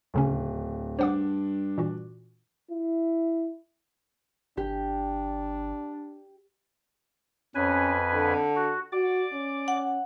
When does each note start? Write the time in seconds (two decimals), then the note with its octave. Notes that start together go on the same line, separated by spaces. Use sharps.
0.14 D1 D#2 C#3 C#4
0.99 G2 D4 C5 F#5 D6
1.78 A#2 E3 F#4
2.71 E4
4.57 G1 D4 G4
7.55 F2 C#4 B4 G#5
8.13 D3
8.56 F#4
8.92 F#4 D5 D6
9.33 C#4
9.68 F#5